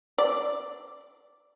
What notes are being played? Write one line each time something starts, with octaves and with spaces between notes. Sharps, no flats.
D5